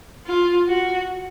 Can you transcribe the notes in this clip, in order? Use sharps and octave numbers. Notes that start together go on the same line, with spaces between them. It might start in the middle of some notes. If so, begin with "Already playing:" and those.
F4
F#4